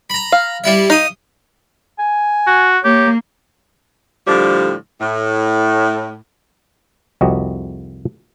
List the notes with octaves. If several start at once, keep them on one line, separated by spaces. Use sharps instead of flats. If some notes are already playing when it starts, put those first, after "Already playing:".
A#5 B5
F5
G3 E4 E5
D#4 F5 D#6
G#5
F#4
A#3 G4 C#5
A2 D3 F3 G3
A2
C2 F2 F#4 G4 D#5